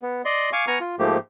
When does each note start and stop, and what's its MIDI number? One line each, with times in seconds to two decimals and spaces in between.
0.02 0.22 59
0.25 0.50 74
0.25 0.50 75
0.25 0.50 84
0.53 0.65 77
0.53 0.65 80
0.53 0.65 85
0.53 0.65 86
0.67 0.79 59
0.67 0.79 80
0.67 0.79 82
0.67 0.79 85
0.67 0.79 89
0.80 0.96 65
0.99 1.18 44
0.99 1.18 53
0.99 1.18 57
0.99 1.18 58
0.99 1.18 67